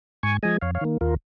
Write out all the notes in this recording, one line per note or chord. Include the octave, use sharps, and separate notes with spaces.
G#2 G#5 C#6
F3 G#3 D#5 G#5
F2 C#5 F5
C#5 F5
D#3 A#3
D#2 F4 A#4